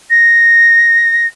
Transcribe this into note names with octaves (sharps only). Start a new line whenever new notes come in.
A#6